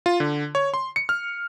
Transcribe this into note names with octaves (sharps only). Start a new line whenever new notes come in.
F4
D3
C#5
C6
C#7
F6